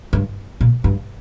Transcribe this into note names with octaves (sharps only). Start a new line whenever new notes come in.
G2
A#2
G2